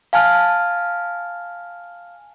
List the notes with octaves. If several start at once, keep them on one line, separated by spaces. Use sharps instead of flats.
F5 G#5 A5 F6